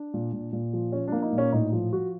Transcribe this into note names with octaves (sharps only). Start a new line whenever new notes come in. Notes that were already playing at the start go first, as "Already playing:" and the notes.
Already playing: D4
A#2
A#2
A#2
F3
F3 C#4
A#3 D4
D#4
A#2
C#4
A2 D#4
F3
F3 F#4